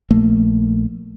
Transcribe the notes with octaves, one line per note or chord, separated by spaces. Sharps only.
A#1 A3 A#3